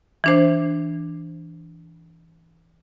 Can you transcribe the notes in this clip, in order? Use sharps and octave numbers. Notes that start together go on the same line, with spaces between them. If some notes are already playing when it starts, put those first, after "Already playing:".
E3 D4 C5